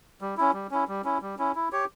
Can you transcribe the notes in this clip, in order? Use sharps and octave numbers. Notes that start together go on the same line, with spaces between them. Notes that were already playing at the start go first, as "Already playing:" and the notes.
G3
C#4 E4
G3
C#4 E4
G3
C#4 E4
G3
C#4 E4
E4
G4 C#5